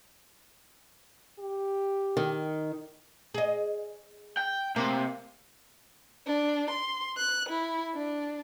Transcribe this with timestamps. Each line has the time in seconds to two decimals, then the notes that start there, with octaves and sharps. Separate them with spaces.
1.40 G4
2.17 D#3
3.34 G#4 D#5
4.37 G5
4.76 C3 A#3
6.27 D4
6.70 C6
7.17 F#6
7.49 E4
7.95 D4